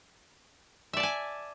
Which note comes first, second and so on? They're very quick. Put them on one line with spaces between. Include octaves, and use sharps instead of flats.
E5 D5 A5 G#5